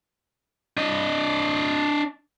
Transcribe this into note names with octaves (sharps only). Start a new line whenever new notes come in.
D4 D#5